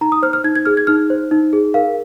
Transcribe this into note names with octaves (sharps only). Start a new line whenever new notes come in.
D#4 A#5
D#6
C5 F6
F6
D#4 G#6
G#6
G#4 F6
G#6
D#4 F6
C5
D#4
G#4
A#4 F5